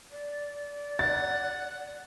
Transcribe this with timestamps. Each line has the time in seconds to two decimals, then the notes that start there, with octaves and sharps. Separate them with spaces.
0.11 D5
0.99 F#5 A6